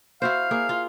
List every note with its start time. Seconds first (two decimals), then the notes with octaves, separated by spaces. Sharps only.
0.22 E4 F#4 C5 F5
0.51 A#3 G#4
0.69 F4